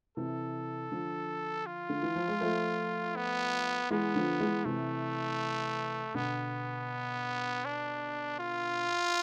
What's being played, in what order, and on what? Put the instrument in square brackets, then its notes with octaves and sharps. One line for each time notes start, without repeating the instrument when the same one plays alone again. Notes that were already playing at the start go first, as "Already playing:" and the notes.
[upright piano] C3 E3 [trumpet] A4
[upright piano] D3 F3
[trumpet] F4
[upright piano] D3
E3
F3
G#3
F3 A3
[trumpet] B3
[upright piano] E3 G#3 [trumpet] B3
[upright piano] D3 F3
E3 G#3
[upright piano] C3 E3 [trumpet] A3
[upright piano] B2 D3 [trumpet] B3
[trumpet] D4
F4